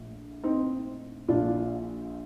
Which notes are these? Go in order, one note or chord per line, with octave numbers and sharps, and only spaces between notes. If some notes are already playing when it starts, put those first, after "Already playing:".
Already playing: A#1 A2 F3
C4 D#4
A#1 A#2 F3 D4 F4